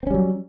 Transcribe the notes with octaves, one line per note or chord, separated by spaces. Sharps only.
F#3 G3 C4 C#4